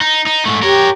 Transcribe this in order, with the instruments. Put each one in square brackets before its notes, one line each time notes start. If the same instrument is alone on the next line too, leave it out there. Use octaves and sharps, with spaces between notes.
[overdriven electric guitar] D#4
D#4
G#2 A3
[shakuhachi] G4 [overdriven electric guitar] A#4 C#5